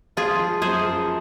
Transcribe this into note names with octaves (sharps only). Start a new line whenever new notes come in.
F3 F4 G#4
F3
F#2 G#4 C5
F3